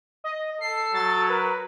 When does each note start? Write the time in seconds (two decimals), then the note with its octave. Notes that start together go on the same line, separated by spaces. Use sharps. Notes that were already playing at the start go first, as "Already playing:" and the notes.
0.24 D#5
0.61 A4 C7
0.94 F#3 A6
1.29 A#4 B4